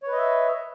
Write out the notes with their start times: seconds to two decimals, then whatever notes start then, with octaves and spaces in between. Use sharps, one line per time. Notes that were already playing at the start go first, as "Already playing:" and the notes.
0.03 C#5
0.08 B4
0.12 D#5
0.17 E5